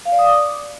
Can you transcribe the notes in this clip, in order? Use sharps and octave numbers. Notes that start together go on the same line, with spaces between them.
F5
D5
D#6
D6